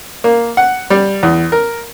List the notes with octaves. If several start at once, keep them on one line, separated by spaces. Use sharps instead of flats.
A#3
F#5
G3
E2
A#4